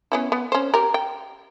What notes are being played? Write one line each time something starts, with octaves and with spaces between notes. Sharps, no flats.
B3 C#4 E4
B3
C#4 C5
G4 A#4
G5